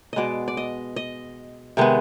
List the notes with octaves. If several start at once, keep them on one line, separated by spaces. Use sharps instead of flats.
B2 G#3 B3 D5 D#5
D5
D#5
D#5
C3 D#3 G#3 B3